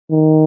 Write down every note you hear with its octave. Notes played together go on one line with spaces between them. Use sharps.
D#3